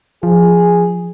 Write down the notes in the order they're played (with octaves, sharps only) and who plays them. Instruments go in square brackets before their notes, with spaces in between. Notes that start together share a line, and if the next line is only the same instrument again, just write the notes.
[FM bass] F3 [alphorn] G#4